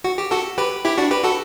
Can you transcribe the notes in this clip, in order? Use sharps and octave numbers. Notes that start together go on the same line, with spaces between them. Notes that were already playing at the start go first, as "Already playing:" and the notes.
F#4
G4
F#4 A4
G4 B4
E4 G4
D4 F#4
G4 B4
F#4 A4